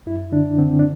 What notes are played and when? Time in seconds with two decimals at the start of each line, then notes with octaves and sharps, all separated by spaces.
0.06 F#2 E4
0.32 D3 D4
0.58 D3 C4
0.79 D4